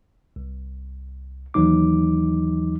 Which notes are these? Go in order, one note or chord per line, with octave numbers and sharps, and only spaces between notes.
C2
D#2 E3 F#3 D#4 D6